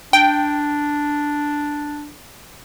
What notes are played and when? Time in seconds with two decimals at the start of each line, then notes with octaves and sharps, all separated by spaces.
0.13 D4 G5